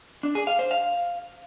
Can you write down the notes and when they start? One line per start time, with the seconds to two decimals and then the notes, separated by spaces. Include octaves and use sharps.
0.23 D4
0.35 G#4
0.47 F5
0.59 C5
0.71 F5